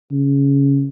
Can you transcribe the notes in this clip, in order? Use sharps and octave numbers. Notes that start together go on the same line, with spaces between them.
C#3